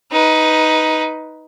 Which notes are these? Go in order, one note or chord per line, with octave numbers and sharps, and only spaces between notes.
D#4 B4